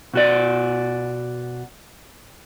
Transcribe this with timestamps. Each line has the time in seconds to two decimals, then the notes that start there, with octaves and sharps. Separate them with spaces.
0.14 B2 F#4 D5